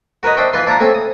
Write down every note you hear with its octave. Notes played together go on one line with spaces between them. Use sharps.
F#4 A#4 B4 C#5 D#5
D4 C5 D#5 E5 G5 C#6
E3 F4 B4 C6
D4 E4 F4 A5 A#5
A3 C4 C#4 E5
D#6